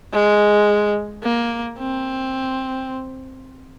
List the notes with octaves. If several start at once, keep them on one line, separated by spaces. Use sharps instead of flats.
G#3
A#3
C4